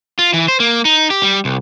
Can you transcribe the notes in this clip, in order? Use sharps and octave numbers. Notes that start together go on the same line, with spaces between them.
F4
E3
C5
A#3
D#4
G4
G3
C2